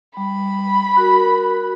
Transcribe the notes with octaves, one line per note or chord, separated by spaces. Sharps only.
G3 B5
F#4 A#4